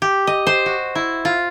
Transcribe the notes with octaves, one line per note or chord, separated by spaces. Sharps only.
G4
D#5
C5
F#4
E4
F4